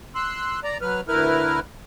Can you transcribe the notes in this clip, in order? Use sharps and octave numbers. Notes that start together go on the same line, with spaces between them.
C6 E6 F#6
D5 A#5
F#3 B4 F6
D2 E4 A#4 B4 F6